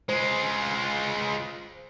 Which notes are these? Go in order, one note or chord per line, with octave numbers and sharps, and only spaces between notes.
G#3 F4 C5